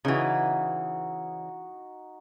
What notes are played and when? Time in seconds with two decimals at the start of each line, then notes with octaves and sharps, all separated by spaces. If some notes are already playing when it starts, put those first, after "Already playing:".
0.05 C#3 E3 D#4 F#4